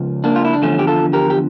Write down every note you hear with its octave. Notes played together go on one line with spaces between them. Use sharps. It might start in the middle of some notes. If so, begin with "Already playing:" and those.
Already playing: C#2 C#3 F3
A#3 D4
F4
E4
D4
E2 D3 F3 A3 C#4
G4
F4 A4
G4 A#4
G4